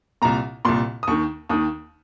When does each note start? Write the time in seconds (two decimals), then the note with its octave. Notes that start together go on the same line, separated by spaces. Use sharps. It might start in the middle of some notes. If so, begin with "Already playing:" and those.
0.22 C2 A#2 A#5
0.65 C2 A#2 C6
1.03 D#6
1.07 D#2 D#3 C#6
1.49 D#2 D#3 D#6